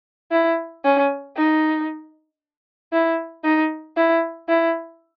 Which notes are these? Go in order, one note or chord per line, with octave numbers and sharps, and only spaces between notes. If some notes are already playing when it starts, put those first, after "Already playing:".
E4
C#4
D#4
E4
D#4
E4
E4